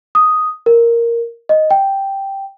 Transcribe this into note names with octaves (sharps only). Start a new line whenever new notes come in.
D#6
A#4
D#5
G5